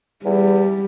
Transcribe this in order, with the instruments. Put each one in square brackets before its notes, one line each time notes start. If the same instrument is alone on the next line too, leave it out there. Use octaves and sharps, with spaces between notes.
[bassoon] E2 [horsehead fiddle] G3